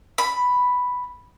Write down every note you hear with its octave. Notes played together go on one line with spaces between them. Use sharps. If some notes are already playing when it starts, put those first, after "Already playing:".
B5